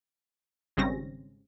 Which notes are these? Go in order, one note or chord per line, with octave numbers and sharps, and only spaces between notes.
G#1 C#3 G3 C4 C#4 A#6